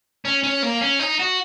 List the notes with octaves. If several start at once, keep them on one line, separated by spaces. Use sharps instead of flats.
C#4
C#4
A#3
C#4
D#4
F#4